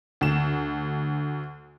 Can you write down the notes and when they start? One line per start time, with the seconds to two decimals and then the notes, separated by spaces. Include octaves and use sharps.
0.21 D2 E7